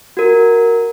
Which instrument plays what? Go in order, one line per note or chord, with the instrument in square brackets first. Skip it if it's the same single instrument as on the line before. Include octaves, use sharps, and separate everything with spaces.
[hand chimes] F#4 A#4